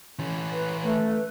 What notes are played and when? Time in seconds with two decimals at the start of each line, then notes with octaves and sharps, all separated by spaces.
0.19 E3 C#4
0.52 B4
0.85 A3 B4